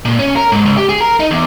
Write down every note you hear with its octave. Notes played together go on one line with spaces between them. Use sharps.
A#2
C#4
A#4
G#2
C#2
G4
G#4
A#4
D#4
E2